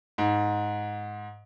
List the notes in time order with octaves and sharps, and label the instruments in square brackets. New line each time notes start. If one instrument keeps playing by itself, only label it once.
[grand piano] G#2